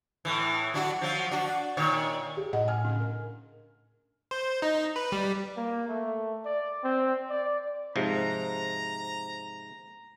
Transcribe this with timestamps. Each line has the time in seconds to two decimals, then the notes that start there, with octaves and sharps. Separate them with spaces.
0.25 A2 E3
0.74 F#3 D4 F#4
1.01 F3 F#3
1.31 D4 F#4
1.77 A#2 D#3 C#5
2.37 G4 G#4
2.53 A2 D#5 F#5
2.68 G#5 F6
2.85 C#3 D4
3.00 A#4
4.31 C5
4.62 D#4
4.96 B4
5.12 G3
5.57 A#3
5.89 A3
6.45 D5
6.84 C4
7.30 D5
7.96 G#2 C3 F3 A#5